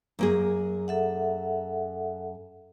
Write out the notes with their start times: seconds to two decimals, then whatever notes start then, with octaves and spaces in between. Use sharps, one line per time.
0.19 F#2 A#3 G#4
0.88 A4 E5 F#5